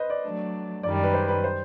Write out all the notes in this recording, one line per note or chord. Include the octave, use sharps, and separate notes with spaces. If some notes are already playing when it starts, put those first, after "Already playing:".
Already playing: B4 C5 D#5
D5
F#3 A3 D4
F#2 D#3 G3 D5
B4
C5
B4
C5